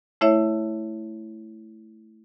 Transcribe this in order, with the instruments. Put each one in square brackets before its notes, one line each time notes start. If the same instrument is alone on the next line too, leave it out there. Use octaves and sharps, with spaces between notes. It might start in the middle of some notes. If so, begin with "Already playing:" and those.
[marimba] A3 E4 C#5 E5